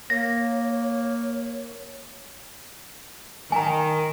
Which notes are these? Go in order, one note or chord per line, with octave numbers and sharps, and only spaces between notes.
A#3 C#5 A#6
D#3 G#5 A#5